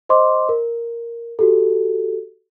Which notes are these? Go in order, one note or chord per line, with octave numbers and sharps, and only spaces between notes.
C5 D#5 C6 D6
A#4
F#4 G4 A4